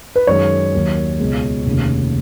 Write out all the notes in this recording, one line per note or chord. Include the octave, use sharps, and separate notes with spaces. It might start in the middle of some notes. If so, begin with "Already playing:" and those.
B4
F#2 D#3 G#3 C#5
D#2 D#3 F#3
C#2 B2 G#3
F1 D#2 C#3